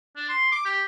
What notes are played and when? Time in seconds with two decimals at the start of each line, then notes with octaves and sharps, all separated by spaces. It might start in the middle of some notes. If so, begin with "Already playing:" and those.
0.16 D4
0.29 C6
0.52 D6
0.65 G4